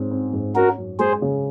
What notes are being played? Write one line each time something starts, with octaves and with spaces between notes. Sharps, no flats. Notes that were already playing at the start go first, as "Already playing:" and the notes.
Already playing: G#2 C4 C#4
C4
G#2
C#4 F#4 A#4
F#2
G#3 G#4 C5
C#3